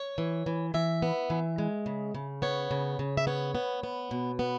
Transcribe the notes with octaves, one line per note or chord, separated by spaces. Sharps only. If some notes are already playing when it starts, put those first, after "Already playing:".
Already playing: C#5
E3
E3
E3 E5
B3
E3
G#3
C#3
C#3
B3 C#5
C#3
C#3
E5
B3 C#5
B3
B3
B2
B3